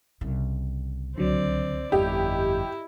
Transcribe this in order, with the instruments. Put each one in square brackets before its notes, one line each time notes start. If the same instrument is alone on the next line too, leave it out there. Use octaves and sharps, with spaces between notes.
[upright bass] C2 C#3
[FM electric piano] C#2 D3 F#3 [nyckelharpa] C4 D5
[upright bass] G1 F2 [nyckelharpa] E4 [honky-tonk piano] G4 [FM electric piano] D#5